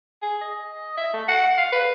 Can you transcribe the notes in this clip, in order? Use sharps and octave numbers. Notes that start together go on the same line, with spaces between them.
G#4
D#5
E5
A3
F#5
F5
B4